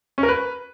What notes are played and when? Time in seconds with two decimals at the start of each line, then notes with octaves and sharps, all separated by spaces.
0.18 C#4
0.23 A#4
0.28 B4